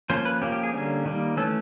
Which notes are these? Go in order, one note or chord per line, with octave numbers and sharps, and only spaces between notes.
F3 A#3 C#4 C5
B4
F3 A#3 C#4 G4
G4
G#4
D3 G3 A#3 C#4
D#3 G3 A#3
E3 A3 C#4 A4